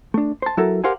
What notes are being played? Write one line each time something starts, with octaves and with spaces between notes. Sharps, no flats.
A3 D4
C5 A5
F#3 E4 A4 A#4
G4 A#4 C5 F5 F#5 G#5